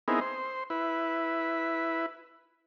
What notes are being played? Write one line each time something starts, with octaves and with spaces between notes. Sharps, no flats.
B3 C4 D#4 E4 G#4 A#4
C5
E4 B4